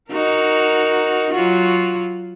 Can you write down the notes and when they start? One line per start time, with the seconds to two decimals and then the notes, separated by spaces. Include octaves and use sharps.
0.11 D#4 F#4 A#4
1.32 F#3 F4 F#4